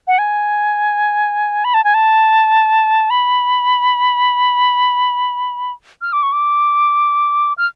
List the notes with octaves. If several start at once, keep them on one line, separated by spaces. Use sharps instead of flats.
F#5
G#5
B5
A5
G#5
A5
B5
F6
D6
C#6
D6
F6